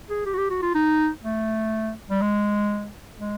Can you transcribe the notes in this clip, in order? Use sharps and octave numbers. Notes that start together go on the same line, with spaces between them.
G#4
G4
F#4
G4
F#4
F4
D#4
A3
G3
G#3
G#3